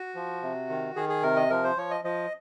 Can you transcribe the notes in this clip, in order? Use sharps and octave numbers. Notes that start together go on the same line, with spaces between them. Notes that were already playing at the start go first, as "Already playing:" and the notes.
Already playing: F#4
F3
C3
D#3
D#3 G#4
G#4
C3 A#4
D#5
F3 A#4
C5
F3 C#5
D#5
F3 D#5